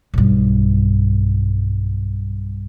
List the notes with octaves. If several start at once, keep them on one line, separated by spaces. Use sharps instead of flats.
B1 G2